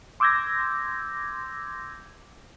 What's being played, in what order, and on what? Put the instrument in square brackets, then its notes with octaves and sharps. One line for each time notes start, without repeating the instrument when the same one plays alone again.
[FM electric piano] C6 D6 E6 G6 G#6 A#6